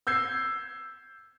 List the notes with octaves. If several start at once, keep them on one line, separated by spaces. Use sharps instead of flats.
E6 G6 G#6 C7